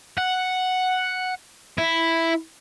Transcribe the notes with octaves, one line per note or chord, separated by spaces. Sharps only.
F#5
E4